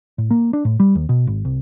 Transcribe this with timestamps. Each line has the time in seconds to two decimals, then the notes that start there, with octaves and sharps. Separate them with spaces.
0.18 A2
0.31 A#3
0.53 D4
0.65 A2
0.80 G3
0.95 D#2
1.09 B2
1.27 G#1
1.45 C2